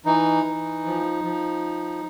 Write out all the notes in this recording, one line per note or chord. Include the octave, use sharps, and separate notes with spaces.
E3 D#4
E3
F3
F3